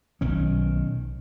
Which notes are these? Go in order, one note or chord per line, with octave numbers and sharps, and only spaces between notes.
B1 D#3 C#4